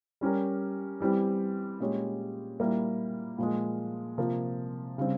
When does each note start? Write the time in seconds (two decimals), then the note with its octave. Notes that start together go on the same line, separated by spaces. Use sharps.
0.21 G3 C#4 G4 A#4
1.00 E3 G3 C4 G4
1.80 A#2 G#3 C#4 G4 C#5
2.59 A#2 G3 A#3 E4
3.38 A#2 F3 G#3
4.18 C3 F3 A#3
4.98 C#3 G3 C4